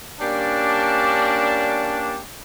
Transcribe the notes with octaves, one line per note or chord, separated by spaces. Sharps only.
G3 A#3 C#4 D4